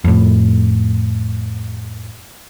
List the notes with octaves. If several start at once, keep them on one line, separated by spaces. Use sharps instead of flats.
F2 A2